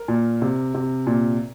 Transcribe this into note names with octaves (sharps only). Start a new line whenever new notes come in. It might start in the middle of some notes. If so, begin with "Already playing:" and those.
Already playing: A#4
A#2
C3
C3
A#2